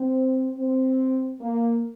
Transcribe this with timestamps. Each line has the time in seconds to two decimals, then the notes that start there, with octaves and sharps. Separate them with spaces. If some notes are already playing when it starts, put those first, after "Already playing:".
Already playing: C4
0.57 C4
1.41 A#3